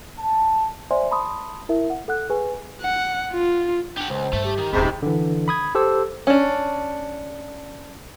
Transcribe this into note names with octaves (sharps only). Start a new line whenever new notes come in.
A5
C5 D5 E5 G#5 C6
A5 B5 C6 D#6
E4 A#4 E5
F#5
A4 F#5 F#6
G#4 B4 G#5
F#5
F4
D4 G4 F#5
C#2 C5
G2 A3
G4
D#3
D#1 G#2 C3 C#4 B5
D3 E3
B5 D#6 G#6
G4 A4 C5 E6
C#4 D4